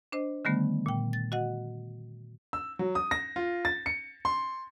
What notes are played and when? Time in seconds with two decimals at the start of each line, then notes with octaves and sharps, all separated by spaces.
0.12 D4 C5 D#5
0.45 D3 D#3 G3 A3 B3
0.86 A#2 G5
1.13 A6
1.32 F#4 D#5 F#5
2.53 E6
2.79 F#3
2.95 D#6
3.11 A#6
3.36 F4
3.65 A6
3.86 C#7
4.25 C6